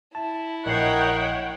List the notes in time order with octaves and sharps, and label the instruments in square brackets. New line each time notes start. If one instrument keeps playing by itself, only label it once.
[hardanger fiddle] E4 [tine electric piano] A5
[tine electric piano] A#1 C7 [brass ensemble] A#4 D#5 [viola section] C#5 F#5 G5